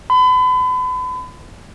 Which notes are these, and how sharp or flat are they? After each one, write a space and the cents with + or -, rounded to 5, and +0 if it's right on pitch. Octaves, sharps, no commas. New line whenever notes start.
B5 +35